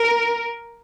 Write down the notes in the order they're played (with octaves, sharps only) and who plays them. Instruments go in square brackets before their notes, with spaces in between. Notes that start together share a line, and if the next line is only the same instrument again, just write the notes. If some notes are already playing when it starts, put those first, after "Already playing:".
Already playing: [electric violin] A#4